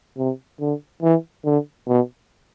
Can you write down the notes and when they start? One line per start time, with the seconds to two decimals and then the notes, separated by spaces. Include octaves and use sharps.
0.18 C3
0.60 D3
1.02 E3
1.45 D3
1.87 B2